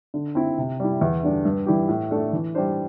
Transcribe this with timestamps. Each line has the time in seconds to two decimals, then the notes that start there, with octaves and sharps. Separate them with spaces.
0.14 D3
0.35 C4 E4
0.58 C3
0.80 G3 E4
1.01 E2
1.23 D3 G3 D4
1.45 G2
1.66 E3 G3 E4 G4
1.89 A2
2.11 A3 D4 A4
2.33 E3
2.55 G3 D4 C5